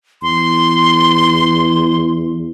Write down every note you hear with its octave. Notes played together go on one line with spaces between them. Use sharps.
E2 C6